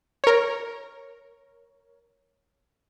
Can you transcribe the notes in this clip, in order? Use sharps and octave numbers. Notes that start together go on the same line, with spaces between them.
A#4 C#5